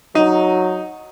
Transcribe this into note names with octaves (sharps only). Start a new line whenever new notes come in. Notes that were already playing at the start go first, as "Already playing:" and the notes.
F#3 D#4